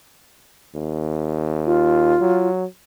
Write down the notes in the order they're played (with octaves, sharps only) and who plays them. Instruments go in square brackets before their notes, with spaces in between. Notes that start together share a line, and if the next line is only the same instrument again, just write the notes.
[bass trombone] D#2
[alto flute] F4
[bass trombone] F#3